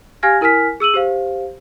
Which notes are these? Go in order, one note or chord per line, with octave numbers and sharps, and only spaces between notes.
G4 F5 G#5 F6 G#6 A#6
E4 A#4 G#5 F6 B6
G#4 E6 D#7 F#7
G4 C5 F5